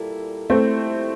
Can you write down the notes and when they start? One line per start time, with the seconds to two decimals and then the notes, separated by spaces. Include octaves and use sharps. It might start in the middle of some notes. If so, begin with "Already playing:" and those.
Already playing: A#2 G3 A#3 E4 A4
0.50 F2 C3 G3 A3 A#3 C4 E4